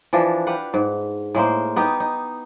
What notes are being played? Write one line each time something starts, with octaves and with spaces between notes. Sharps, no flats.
E3 F3 D4
G4 B4 F5 F#5
G#2
A2 G#3 A#3 C5
B3 D#4 G4
D#4